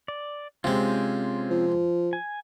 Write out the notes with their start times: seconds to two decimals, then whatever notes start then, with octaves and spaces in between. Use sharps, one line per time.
0.08 D5
0.64 C3 G#3 C4 C#4 F4
1.51 F3
2.13 G#5